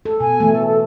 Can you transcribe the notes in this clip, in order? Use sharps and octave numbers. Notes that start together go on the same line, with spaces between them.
A4
B2 G#5
E3 A3
A4
A4